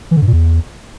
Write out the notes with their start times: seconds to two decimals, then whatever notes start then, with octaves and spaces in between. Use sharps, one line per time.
0.11 E3
0.17 D3
0.22 G2
0.27 A#2
0.33 E2